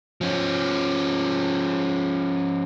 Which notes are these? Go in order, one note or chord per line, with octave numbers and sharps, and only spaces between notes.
F3 C#4